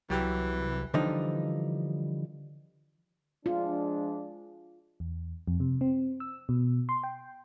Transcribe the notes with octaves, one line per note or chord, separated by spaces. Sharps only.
C2 E3 F#3 G4
D3 E3 F3 G3 D#4
F3 G#3 D4 F4
E2
F2
C3
C4
E6
B2
C6
G5